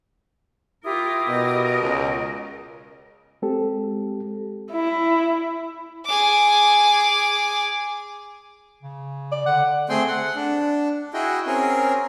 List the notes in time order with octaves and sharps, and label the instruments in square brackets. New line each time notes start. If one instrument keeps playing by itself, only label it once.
[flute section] E4 G4 D#6 [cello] F4 A#4
[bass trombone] B2 [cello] A#4 D#5
[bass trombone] C#2
[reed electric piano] G#3 C4 G4 A4
[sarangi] E4
[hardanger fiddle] G#4 D6
[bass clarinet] C#3
[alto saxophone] D5
[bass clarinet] D3 [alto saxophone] F#5
[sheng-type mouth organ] A3 C4 G#4 G5 C6
F#5
D4
E4 F#4 G#4 D#5 G5
C4 C#4 G#4 A#4